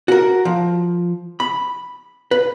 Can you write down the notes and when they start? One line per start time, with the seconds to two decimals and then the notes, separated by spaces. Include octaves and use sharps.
0.08 F#4 A#4
0.45 F3
1.40 B5
2.31 B4